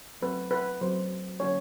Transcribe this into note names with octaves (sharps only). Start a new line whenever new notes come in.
F#3 A3 C4 B4
B4
F#3 A3 C4 C5
D3 F#3 A#3 C#4 C#5